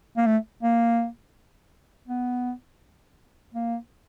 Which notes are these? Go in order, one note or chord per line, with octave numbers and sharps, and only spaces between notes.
A#3
A3
A#3
B3
A#3